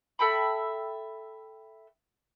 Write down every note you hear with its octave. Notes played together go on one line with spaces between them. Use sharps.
A4 E5 G5 B5